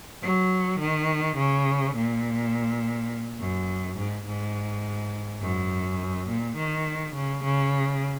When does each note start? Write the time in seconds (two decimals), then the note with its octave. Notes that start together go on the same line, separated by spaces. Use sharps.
0.23 F#3
0.80 D#3
1.37 C#3
1.96 A#2
3.40 F#2
3.98 G#2
4.27 G#2
5.42 F#2
6.29 A#2
6.58 D#3
7.15 C#3
7.44 C#3